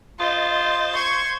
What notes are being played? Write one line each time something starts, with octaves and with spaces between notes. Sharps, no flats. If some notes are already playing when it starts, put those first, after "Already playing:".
F4 C5 D#5 A6
C6 C#6 G#6